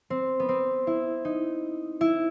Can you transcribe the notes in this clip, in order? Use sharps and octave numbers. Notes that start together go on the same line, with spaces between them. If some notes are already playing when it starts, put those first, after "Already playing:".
C4
B3
C4
E4
D#4
E4